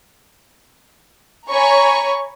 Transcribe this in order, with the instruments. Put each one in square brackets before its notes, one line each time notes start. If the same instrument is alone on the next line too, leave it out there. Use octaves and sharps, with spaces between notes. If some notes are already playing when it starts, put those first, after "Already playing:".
[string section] C#5 G#5 A#5 B5 C#6